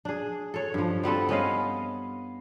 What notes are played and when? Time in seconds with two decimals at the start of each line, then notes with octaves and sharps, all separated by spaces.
0.05 D4 G#4
0.54 A4 C#5
0.74 G2 F3
1.03 G3 B3 C4 A4
1.29 B3 C#4 D#5 F5